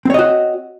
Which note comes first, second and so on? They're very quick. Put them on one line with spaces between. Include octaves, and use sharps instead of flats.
C4 C#5 D#5 F#4